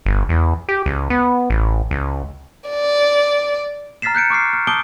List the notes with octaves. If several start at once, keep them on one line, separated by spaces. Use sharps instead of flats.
G1
E2
G4
C#2
B3
A1
C#2
D5
A#5 F6 A6 B6 C7 E7
F#6 G6 C#7 D7
C#6 D6 F6 C7
F6
A5 D6 D#6 G6 D7 G7